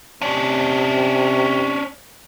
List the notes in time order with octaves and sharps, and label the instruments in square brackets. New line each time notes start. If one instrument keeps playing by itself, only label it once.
[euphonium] C3 [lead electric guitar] C#4 D4